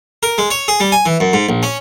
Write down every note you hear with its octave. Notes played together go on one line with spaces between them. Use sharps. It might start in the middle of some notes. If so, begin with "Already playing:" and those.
A#4
G#3
C#5
G#4
G3
G#5
E3
F#2
G#2
A#1
C#4